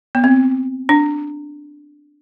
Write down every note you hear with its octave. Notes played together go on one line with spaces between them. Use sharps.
B3
C4
D4